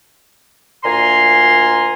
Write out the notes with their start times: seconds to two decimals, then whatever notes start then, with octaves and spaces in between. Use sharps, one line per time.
0.84 D2 A#2 G#5 A#5 C6